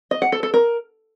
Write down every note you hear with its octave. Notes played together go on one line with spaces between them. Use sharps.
D#5
F#5
A4
A4
A#4